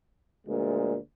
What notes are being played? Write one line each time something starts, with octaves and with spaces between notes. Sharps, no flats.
D2 A#2 G#3